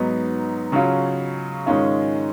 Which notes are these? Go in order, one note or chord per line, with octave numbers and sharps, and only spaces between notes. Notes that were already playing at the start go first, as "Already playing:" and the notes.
Already playing: G#2 F#3 B3 D#4
C#3 F#3 C#4 F4
G#2 D#3 G#3 C#4 F4